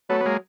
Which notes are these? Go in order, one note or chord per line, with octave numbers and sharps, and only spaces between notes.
F#3 A3 B3
B3
G#3 A#3